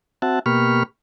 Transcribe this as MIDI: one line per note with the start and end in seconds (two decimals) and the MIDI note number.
0.22 0.39 60
0.22 0.39 66
0.22 0.39 76
0.22 0.39 78
0.22 0.39 81
0.46 0.83 47
0.46 0.83 58
0.46 0.83 67
0.46 0.83 83
0.46 0.83 85
0.46 0.83 89